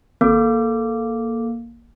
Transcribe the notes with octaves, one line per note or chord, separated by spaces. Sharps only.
G#1 A#3 A4 D6